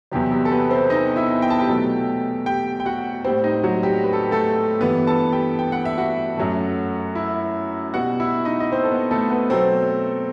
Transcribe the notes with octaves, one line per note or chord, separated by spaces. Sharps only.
E2 C3 F#3 G3 G4
G3 G4
A4
B3 B4
C4 C5
D#4 D#5
E4 E5
G5
A5
G4 G5
B2 F#3 A3
G4 G5
G5
F#4 F#5
A2 G3 C4 C5
D#4 D#5
F#3 F#4
G3 G4
B4
A4
G4
A3 A4
G2 E3 G3 B3 B4
A4 A5
G4 G5
G5
F#5
E5
F#4 F#5
F#2 F#3 A3
E4 E5
B2 G3 F#4 F#5
E4 E5
D#4 D#5
D#5
C4 C5
A4
B3 B4
A3 A4
B3 B4
B2 F#3 A3 C4 C5